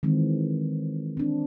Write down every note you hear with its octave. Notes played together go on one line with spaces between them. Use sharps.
D#3 E3 G#3 C4
C4 D4